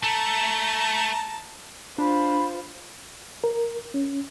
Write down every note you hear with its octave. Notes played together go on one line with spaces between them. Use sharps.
A3 A5 A#5
D4 F4 C5 B5
A#4
C#4